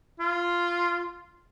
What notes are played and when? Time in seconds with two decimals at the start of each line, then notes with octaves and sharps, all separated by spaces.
0.20 F4